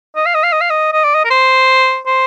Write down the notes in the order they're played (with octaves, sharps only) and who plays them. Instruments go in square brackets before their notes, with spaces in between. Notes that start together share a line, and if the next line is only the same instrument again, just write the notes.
[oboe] D#5
F5
D#5
F5
D#5
F5
D#5
D#5
D5
D#5
A#4
C5
C5